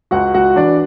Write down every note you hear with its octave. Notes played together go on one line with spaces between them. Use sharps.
C#2 F#4 F#5
C#2 F#4 F#5
E3 D4 D5